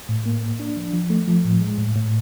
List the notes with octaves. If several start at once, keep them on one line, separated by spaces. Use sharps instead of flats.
A2
A#3
A#3
D4
F3
F3
A3
F3
A2
G#3
A2
A2